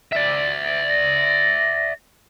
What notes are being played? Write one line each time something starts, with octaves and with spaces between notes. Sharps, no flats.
D5 E5
A#6